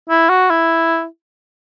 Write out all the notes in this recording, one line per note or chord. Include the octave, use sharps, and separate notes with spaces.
E4
F#4
E4